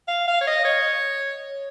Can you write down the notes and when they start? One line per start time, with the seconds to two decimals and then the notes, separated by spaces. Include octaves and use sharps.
0.08 F5
0.28 F5
0.41 C#5
0.47 D#5
0.65 C#5